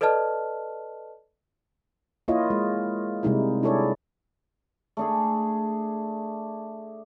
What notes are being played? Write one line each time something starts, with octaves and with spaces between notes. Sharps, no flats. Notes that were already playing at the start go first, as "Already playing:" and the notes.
A4 B4 D5 D#5 A5 F6
A#3 E4 F4 C#5 D#5
G#3
C3 G3 G#3 D#4 E4
D4 E4 G#4 A4 C#5 D5
A3 D4 G#4